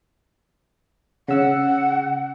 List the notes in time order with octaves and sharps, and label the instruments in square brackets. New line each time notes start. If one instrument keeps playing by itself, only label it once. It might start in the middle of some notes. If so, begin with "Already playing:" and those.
[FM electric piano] C#3 E6 [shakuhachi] F#5